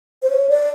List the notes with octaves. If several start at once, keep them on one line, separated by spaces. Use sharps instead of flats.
C5
C#5
D5